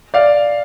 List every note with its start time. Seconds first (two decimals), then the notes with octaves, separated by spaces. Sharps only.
0.14 D5 F5